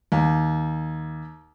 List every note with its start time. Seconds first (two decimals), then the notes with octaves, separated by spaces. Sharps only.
0.12 D#2